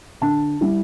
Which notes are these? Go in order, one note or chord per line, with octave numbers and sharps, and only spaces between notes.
D3 A5
G3 E4